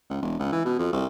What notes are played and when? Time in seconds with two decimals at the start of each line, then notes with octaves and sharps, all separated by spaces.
0.10 C#2
0.22 E1
0.39 C#2
0.52 E3
0.65 B2
0.79 F2
0.93 C2